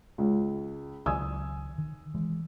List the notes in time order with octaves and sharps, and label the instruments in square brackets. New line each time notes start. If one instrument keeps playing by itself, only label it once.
[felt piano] C#2
[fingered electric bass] C#2 D#3 F#3 [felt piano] G#5 D#6 E6
[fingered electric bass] D#3
E3 G#3